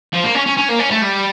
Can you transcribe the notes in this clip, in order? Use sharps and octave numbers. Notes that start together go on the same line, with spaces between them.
F3
A#3
C#4
C#4
C#4
A#3
C#4
A3
G3